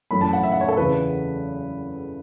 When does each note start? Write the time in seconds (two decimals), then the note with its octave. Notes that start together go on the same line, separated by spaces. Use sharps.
0.11 F#2 E3 A3 C#4 B5
0.21 A5
0.33 F#5
0.43 E5
0.52 F#5
0.61 C#5
0.68 A4
0.77 E2 C#3 E3 B4